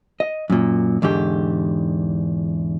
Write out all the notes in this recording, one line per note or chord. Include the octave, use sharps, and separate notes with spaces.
D#5
F#2 A#2
E2 G#2 D3 G4